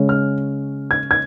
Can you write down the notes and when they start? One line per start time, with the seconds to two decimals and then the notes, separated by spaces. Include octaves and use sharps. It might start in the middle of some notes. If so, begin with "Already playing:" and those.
Already playing: C#3 G#3 C#4
0.09 F6
0.91 G#6
1.11 G#6